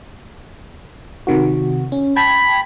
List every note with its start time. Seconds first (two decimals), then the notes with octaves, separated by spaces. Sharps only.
1.27 C3 D#3 F#4
1.92 C#4
2.16 G5 A5 B5 G#6